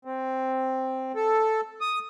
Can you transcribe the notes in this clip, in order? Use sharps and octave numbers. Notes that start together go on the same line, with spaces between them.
C4
A4
D#6